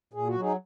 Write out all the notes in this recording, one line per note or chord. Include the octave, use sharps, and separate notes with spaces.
A#2 G#4
F#4
F#3
D#4 G#4